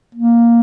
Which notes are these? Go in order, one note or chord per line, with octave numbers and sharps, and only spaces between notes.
A#3